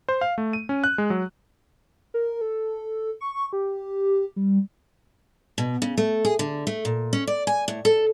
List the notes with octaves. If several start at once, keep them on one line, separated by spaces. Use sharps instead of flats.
C5
F5
A3
D#7
C#4
F#6
G#3
F#3
A#4
A4
C#6
G4
G3
B2
C#3
A3
G#4
D3
A3
A#2
C#4
D5
G#5
A2
A4